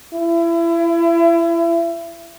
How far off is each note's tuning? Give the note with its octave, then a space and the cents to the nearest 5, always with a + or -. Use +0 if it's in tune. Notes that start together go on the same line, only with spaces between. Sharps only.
E4 +30